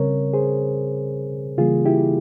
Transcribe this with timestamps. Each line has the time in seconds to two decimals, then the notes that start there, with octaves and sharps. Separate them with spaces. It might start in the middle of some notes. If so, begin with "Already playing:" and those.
Already playing: C#3 G3 C4 A#4 C#5
0.33 G#4 C5
1.57 C#3 E3 G3 A#3 F4 G#4
1.85 E4 G4